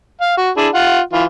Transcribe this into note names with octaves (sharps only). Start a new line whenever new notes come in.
F5
F#4
D4 E4 G#4
F4 F#5
E3 F4